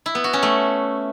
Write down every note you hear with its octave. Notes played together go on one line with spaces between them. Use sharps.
E4
B3
F#4
C#4
A3